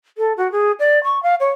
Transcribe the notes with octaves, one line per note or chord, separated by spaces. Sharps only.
A4
F#4
G#4
D5
C#6
F5
C#5